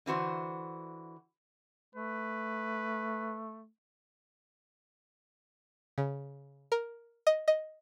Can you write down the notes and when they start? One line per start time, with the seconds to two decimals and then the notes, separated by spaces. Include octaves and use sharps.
0.06 D3 E3 F#4 C5
1.95 A3 B4
5.98 C#3
6.72 A#4
7.27 D#5
7.48 D#5